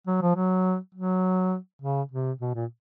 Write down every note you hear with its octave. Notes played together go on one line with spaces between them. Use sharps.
F#3
F3
F#3
F#3
C#3
C3
B2
A#2